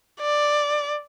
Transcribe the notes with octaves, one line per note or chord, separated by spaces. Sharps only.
D5